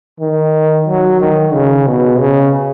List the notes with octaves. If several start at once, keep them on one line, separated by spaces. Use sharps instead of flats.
D#3
F#3
D#3
C#3
B2
C#3